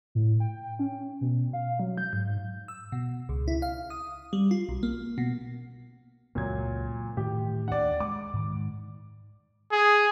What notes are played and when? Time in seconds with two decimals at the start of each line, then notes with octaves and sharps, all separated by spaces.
0.15 A2
0.40 G5
0.79 C#4
1.21 B2
1.53 F5
1.80 F#3
1.98 G6
2.13 G#2
2.68 E6
2.92 B2
3.29 C#2
3.48 E4
3.62 F5
3.90 D#6
4.33 G3
4.51 F4
4.69 B1
4.83 A#3
5.18 B2
6.35 C#2 F#2 A#2 F#3 G#6
7.17 A2 D#3 E3 G4
7.68 D#2 D4 D5 F#5
8.00 G#3 D6
8.33 G#2 D#3
9.72 G#4